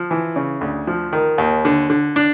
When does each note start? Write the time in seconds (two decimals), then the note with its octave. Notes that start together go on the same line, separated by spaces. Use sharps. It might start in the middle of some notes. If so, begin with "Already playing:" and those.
Already playing: F3
0.11 E3
0.36 C#3
0.61 D2
0.87 F3
1.13 D#3
1.38 D#2
1.65 D3
1.90 D3
2.16 D4